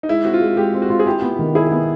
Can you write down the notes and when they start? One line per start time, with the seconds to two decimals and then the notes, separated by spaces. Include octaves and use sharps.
0.03 D#4
0.09 G#3 E4
0.25 C4 F#4
0.34 F4
0.41 G#3
0.57 G#3 G4
0.74 C4
0.82 F#4
0.90 F4
1.00 G#4
1.07 E4 G4
1.22 B3
1.39 D#3
1.55 E4 G#4
1.71 B3